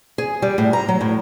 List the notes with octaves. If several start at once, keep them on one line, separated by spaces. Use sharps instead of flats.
G#4
G3
A2
A#5
F#3
A2